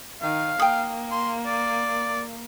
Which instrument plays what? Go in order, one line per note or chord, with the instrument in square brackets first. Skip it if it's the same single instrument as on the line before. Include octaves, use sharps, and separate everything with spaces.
[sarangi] D#3 [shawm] F5
[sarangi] A#3 [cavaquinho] G5 D#6
[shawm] C6
D5